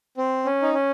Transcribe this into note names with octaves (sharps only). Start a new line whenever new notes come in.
C4
C#4
D#4
C#4